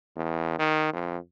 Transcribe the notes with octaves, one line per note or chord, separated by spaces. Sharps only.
E2
D#3
F2